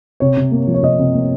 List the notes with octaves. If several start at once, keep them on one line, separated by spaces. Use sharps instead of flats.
C3 C#5
C3
A#3
F3
C#5
C3 D#5
C3
A#3